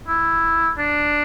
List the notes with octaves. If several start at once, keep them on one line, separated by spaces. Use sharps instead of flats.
E4
D4